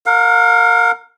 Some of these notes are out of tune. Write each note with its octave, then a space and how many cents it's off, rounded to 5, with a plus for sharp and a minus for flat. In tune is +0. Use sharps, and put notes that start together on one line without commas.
A#4 -20 F5 +40